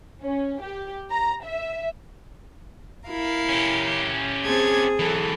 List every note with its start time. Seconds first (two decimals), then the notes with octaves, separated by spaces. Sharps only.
0.24 C#4
0.62 G4
1.11 A#5
1.44 E5
3.08 E4 A#4 F5
3.49 C#4 G4
4.46 C4 G#4 A5 G#6
4.99 E3 F#3 A4